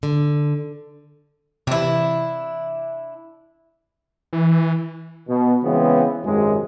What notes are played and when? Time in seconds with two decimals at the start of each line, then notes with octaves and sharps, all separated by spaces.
0.03 D3
1.67 C3 E3 D4 E4
4.33 E3
5.28 B2
5.63 C#3 E3 G#3 B3 C4
6.25 G#1 F#2 C3 G#3